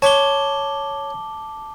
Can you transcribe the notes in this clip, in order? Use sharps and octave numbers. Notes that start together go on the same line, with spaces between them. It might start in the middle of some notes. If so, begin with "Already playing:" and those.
C#5 A5 D6 G7